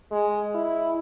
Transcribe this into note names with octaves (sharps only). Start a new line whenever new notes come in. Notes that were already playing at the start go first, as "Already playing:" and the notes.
G#3
E4